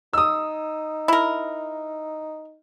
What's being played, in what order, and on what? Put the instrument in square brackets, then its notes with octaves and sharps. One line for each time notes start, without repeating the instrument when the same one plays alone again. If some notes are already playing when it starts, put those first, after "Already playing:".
[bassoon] D#4 [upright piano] D#6 E6
[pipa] E4 A#4